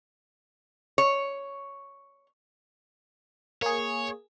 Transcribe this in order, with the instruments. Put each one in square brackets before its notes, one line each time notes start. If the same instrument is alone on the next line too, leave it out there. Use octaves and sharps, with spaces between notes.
[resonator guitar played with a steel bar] C#5
[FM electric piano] A#3 G#4 [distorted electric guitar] C#5